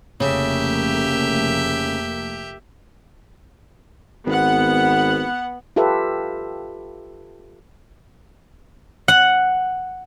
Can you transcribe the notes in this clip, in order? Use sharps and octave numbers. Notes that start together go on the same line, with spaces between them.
F1 C#3 A3 A#3 G4 E5
G#1 B3 F#5
F4 G4 A4 B4 E5
F#5